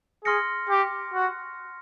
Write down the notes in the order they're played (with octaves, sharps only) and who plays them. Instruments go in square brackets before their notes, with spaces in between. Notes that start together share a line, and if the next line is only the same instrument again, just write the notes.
[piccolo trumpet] G#4 [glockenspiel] C6 F6 A#6 C#7
[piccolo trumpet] G4
F#4